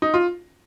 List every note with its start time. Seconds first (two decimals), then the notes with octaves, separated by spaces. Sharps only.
0.02 D#4
0.14 F4